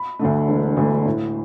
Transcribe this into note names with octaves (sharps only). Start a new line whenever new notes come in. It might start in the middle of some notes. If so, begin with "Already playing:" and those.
Already playing: B5
D2 D3 A3
E1
D2 D3 A3
A2